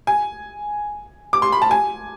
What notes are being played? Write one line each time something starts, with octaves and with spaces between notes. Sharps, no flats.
G#5
D6
C6
B5
A5
G#5